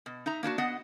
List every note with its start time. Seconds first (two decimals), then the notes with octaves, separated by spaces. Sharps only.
0.06 B2
0.26 D#4 E5 A#5
0.43 A#3 D4 D#4 F#4
0.58 B3 D#5 F#5